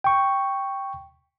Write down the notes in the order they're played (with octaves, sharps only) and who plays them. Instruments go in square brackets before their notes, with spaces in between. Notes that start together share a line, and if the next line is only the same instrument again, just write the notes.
[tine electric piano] G5 C#6